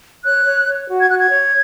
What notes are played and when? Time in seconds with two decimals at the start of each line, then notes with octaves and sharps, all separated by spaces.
0.25 C#5 F#6
0.46 C#5
0.68 C#5
0.89 F#4
0.99 G#6
1.09 F#4 F#6
1.19 G#6
1.31 C#5